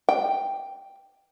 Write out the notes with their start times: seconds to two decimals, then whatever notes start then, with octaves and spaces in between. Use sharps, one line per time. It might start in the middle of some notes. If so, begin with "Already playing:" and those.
0.09 G5